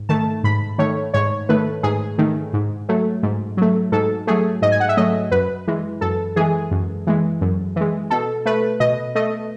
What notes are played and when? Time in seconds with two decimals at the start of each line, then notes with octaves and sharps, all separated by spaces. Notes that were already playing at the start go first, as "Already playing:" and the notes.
Already playing: G#2
0.09 D#3 A3 A5
0.44 G#2 B5
0.78 D#3 A3 C#5
1.14 G#2 C#5
1.49 D#3 A3 B4
1.83 G#2 G#4
2.18 D#3 A3
2.53 G#2
2.89 F#3 A3
3.23 G#2
3.57 F#3 A3
3.92 G#2 A4
4.27 F#3 A3 G#4
4.62 G#2 D#5
4.72 G#5
4.80 F#5
4.89 E5
4.97 F#3 A3 D#5
5.31 F#2 B4
5.67 E3 G#3
6.01 F#2 A4
6.36 E3 G#3 G#4
6.71 F#2
7.07 E3 G#3
7.41 F#2
7.76 E3 G#3
8.10 B2 A4
8.45 A3 B4
8.80 B2 D#5
9.15 A3 D#5